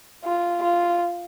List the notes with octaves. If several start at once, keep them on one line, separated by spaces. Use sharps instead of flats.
F4
F4